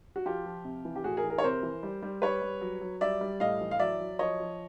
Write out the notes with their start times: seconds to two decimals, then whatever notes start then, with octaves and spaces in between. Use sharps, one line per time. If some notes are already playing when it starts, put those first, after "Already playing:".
0.16 F#4
0.26 F3 F4 G4
0.46 F3
0.65 C3
0.85 E3
0.96 G4
1.03 A2 F#4 G#4
1.17 G#4 A#4
1.24 E3
1.30 G#4 A#4
1.38 C#5
1.43 C3 A#4 C5
1.63 E3
1.83 G3
2.02 G3
2.22 G3 B4 C#5
2.42 G3
2.61 F#3
2.81 F#3
3.01 G3 D5 E5
3.21 G3
3.40 A2 D#5 F5
3.61 E3
3.71 F5
3.79 F#3 D5 E5
4.00 F#3
4.19 F3 C#5 D#5
4.40 F3